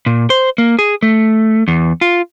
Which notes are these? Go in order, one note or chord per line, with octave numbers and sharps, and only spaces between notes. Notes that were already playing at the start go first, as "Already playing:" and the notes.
A#2
C5
A#3
G#4
A3
E2
F4